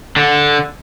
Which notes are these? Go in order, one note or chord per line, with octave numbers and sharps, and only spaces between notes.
D3